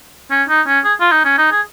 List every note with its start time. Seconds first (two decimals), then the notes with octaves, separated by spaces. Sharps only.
0.31 C#4
0.49 D#4
0.67 C#4
0.84 G#4
1.00 F4
1.11 D#4
1.25 C#4
1.38 D#4
1.52 G#4